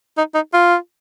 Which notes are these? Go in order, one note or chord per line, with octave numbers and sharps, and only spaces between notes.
D#4
D#4
F4